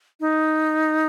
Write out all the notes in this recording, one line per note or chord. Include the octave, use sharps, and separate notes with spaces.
D#4